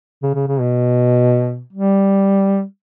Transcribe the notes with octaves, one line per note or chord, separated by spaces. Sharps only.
C#3
C#3
C#3
B2
G3